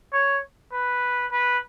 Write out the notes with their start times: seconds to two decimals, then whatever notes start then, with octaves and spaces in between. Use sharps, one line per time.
0.13 C#5
0.73 B4
1.32 B4